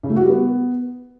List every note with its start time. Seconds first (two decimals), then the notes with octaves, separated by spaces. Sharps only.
0.03 C#3
0.10 A3
0.16 F#4
0.23 G3
0.29 B3